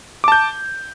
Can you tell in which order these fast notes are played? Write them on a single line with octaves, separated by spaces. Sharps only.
D6 A5 G6